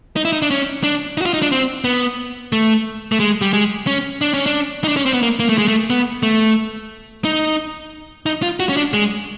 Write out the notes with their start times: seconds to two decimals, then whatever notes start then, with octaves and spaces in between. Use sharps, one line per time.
0.16 D#4
0.25 E4
0.33 D#4
0.42 D4
0.51 C#4
0.84 D4
1.18 D#4
1.21 F#4
1.26 F4
1.34 D#4
1.42 D4
1.52 C4
1.84 B3
2.52 A3
3.12 A3
3.20 G#3
3.41 G3
3.53 G#3
3.87 C#4
4.21 D4
4.34 C#4
4.46 D4
4.84 D#4
4.88 D4
4.97 C#4
5.06 C4
5.13 B3
5.23 A#3
5.40 A#3
5.49 A3
5.58 G#3
5.68 A3
5.90 B3
6.23 A3
7.25 D#4
8.26 D#4
8.42 F4
8.60 F#4
8.69 C#4
8.77 D4
8.93 G#3